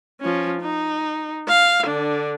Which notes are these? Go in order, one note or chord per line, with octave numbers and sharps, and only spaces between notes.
F3 C#4
D#4
F5
D3 D4